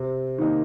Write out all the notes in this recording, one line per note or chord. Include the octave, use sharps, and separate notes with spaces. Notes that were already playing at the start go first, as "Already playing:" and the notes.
Already playing: C3
D#3 A#3 D#4